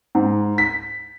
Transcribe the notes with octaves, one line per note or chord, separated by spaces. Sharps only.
G#2
B6